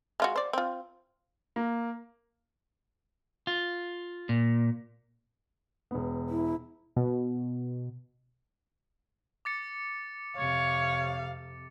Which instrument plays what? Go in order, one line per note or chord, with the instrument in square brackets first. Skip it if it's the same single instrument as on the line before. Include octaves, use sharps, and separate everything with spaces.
[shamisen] G#3 F4 F#4
C5 D5
C4 F4
[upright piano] A#3
[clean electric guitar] F4
A#2
[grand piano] E1 B3
[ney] E4
[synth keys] B2
[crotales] D6 A6 C#7
[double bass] F2 C3 [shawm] C#5 [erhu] F5